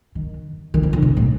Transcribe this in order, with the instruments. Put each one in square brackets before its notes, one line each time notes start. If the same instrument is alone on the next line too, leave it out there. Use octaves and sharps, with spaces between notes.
[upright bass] D#3
D#3
F3
D3
C3
A2